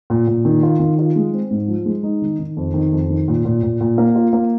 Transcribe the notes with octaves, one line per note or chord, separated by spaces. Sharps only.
A#2
A#2
D#3
F4
D#3
F4
G#3
C4
G#2
F3
G#3
D#4
D#3
D#3
F2
D#3
F2
D#3
A#2
A#2
A#2
A#2
A#3
F4
A#3